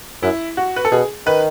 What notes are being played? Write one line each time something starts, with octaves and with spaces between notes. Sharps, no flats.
F#2 E4
F#4
B4
A4
B2 G#4
D#3 B4